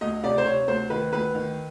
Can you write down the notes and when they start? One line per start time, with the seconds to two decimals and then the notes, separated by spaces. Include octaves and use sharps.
0.01 D2 D#5
0.23 C3 D5
0.38 C5
0.45 C3 C#5
0.68 D2 C5
0.90 D#3 B4
1.12 D2 B4
1.35 D#3